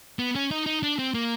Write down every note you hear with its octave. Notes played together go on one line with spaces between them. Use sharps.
B3
C#4
D#4
D#4
D4
C4
A#3